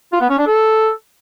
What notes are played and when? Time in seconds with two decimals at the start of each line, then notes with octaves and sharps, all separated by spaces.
0.12 F4
0.21 B3
0.30 C#4
0.38 D4
0.47 A4